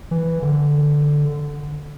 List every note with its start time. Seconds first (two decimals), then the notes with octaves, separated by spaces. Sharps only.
0.11 E3
0.42 D3